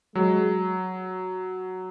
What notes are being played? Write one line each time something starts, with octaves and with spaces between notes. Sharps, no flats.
F#3 G#3